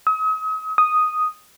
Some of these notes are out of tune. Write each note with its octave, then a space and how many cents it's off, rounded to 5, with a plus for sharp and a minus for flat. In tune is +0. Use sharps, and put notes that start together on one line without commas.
D#6 +40
D#6 +0